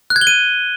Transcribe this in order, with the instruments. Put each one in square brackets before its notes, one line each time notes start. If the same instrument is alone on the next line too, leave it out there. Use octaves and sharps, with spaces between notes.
[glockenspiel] F#6
G#6
G7
D#7